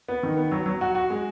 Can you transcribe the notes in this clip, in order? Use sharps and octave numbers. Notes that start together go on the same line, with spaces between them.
B3
D#3
B3
F#3
F#3
F#4
F#4
G#3